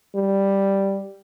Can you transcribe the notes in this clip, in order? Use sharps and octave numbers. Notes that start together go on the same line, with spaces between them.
G3